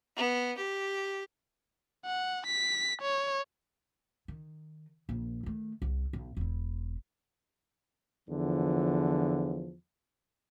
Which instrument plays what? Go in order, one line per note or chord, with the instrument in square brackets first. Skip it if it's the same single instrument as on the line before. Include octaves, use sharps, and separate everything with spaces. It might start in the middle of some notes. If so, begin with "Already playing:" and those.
[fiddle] B3
G4
[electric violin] F#5
B6
C#5
[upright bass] D#3
A#1
D#3 A3
C2
B1
E1 E4
[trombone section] E2 D3 F3